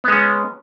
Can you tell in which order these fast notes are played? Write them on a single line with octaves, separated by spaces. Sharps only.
B3 G#3 C#4